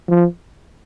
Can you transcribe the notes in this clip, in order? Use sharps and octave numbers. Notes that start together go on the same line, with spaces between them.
F3